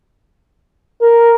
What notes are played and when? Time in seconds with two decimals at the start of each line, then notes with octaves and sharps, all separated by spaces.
1.02 A#4